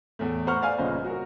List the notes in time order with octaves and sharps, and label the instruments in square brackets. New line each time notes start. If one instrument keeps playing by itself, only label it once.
[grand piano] E2 A2 A3
B4 C5 F#5 A#5 C#6 F6
D5 F5 G#5
G1 A#2 C#3 C5 D#5
F#4 A#4